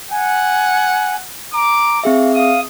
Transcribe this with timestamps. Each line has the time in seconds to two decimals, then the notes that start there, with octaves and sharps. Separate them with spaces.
0.11 F#5 G#5
1.53 A#5 D6
2.04 C4 G#4 E5 F5
2.34 F5 D#6